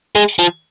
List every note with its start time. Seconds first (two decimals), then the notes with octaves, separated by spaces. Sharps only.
0.15 G#3
0.39 F3